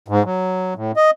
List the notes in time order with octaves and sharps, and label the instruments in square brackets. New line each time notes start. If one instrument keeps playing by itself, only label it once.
[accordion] G#2
F#3
A2
D#5